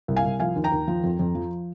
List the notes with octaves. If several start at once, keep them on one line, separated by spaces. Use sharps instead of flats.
C2
F5 G#5
C2
F3 F5 G#5
D#2
G5 A#5
D#2
F3
F2
F2
F3